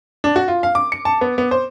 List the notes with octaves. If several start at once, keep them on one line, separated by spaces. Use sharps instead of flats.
D4
F#4
F4
F5
D6
C#7
A5
B3
B3
C5